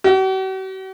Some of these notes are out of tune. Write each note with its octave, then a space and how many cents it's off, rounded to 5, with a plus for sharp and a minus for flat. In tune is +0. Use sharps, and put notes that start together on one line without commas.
F#4 +45